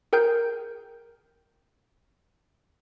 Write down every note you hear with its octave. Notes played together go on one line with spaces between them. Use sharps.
G#4 A#4 G5 F6 G6